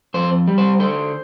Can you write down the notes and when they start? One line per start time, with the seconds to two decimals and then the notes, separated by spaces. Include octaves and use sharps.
0.14 F2 C5
0.47 G3
0.58 C5
0.79 D3 C5